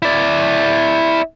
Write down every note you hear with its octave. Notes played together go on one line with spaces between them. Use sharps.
E4 D5